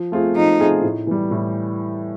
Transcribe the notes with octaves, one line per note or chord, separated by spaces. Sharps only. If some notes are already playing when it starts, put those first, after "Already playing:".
Already playing: F3
A3 C4 F4 G#4
F3 D#4
A3 C4 F4 G#4
A2
E3 G3
A2